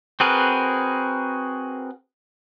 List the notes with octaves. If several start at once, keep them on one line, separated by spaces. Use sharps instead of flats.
C4 F#4 G#4 A#4 B4